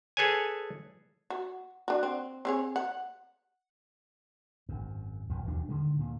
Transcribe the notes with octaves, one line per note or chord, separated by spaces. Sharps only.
G#4 A4 B4 C#5 G#5
F#4
D4 F#4
C4
C4 G#4 C#5
F#5
G#1 F#2
D#1 B1 F2
E1 D#2 F#3 D4
D3 D#3 G#3
D2 A#2